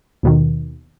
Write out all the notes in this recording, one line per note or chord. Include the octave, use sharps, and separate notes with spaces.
D#2 B2 D#3